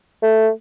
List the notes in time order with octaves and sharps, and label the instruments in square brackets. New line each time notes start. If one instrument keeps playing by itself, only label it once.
[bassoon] A3